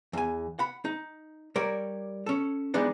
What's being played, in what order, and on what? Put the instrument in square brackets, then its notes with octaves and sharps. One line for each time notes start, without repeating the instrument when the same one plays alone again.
[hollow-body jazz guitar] E2 G#5
F#5 B5
D#4
G3 A#4 C#5 D5
C#4 A4
E3 G3 G#3 B3 D4 D#4